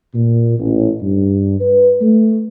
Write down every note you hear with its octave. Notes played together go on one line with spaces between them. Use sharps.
A#2
A1
G2
B4
A3